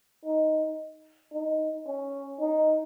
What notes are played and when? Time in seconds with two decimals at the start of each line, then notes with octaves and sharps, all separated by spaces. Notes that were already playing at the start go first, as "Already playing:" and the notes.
0.26 D#4
1.33 D#4
1.87 C#4
2.41 D#4